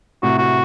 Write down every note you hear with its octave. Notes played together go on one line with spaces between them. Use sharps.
A2 C3 F#4
F#4